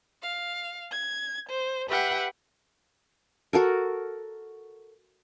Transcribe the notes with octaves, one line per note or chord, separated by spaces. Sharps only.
F5
G#6
C5
G4 B4 E5 F#5 G5
F#4 A4 A#4